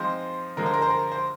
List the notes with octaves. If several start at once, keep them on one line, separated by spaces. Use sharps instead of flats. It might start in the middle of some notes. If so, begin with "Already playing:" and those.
Already playing: F3 G#3 C4 D#4 C5
D3 F3 G#3 A#4
C5
A#4
C5
A#4
C5